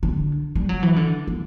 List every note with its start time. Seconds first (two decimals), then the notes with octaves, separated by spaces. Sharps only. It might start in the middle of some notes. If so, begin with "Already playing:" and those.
0.03 D3
0.56 G3
0.69 F#3
0.83 E3
0.96 D3
1.27 E3